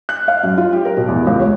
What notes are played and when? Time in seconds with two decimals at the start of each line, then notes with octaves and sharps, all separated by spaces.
0.09 F#6
0.28 F5
0.43 F#2
0.58 F4
0.73 G4
0.85 A#4
0.97 B2
1.08 E2
1.27 C#2
1.40 C#5